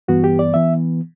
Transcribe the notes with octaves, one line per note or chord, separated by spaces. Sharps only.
G2 E3 B3 F#4
G4
D5
E3 B3 E5